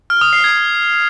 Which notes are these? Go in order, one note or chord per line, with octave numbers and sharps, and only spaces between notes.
F6
D#6
C7
G#6